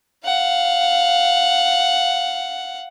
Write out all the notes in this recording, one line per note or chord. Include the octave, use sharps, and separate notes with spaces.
F5 F#5